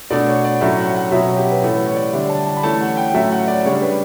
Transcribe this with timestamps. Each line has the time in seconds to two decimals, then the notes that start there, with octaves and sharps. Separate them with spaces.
0.10 B2 A3 D4 D5
0.27 C#5
0.44 D5
0.61 A2 F#3 A3 C#4 E5
0.78 F#5
0.95 F#5
1.12 B2 F#3 C#4 E5
1.36 G4
1.51 B4
1.62 A2 E3 A3 C#4 A4
1.74 B4
1.85 C#5
1.96 D5
2.13 D3 G3 D4 E5
2.29 A5
2.46 A5
2.56 B5
2.63 E3 A3 C#4 A5
2.81 F#5
2.97 G5
3.14 A2 F#3 A3 C#4 E5
3.31 F#5
3.48 D5
3.64 C#3 G3 D4 C#5
3.82 B4